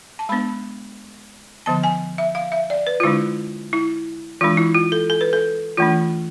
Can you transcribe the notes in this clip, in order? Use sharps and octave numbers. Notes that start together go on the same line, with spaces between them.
A5
G#3 B3 D4 B5
D3 F3 B3 A5
G#5
E5
F5
E5
D5
B4
F4
D3 G#3 D4 E4
E4
E3 G#3 D4 F4
E4
F4
A4
A4
B4
A4
E3 A3 D4 F4